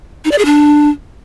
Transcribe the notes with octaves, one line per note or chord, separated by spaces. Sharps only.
D#4
D5
G#4
D4